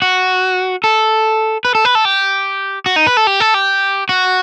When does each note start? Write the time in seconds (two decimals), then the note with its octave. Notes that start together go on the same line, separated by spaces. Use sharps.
0.02 F#4
0.84 A4
1.65 B4
1.75 A4
1.85 B4
1.95 A4
2.05 G4
2.86 F#4
2.96 D#4
3.07 B4
3.17 A4
3.27 G4
3.40 A4
3.54 G4
4.09 F#4